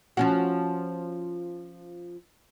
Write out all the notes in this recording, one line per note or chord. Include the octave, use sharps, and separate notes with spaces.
F3 C#4 F#4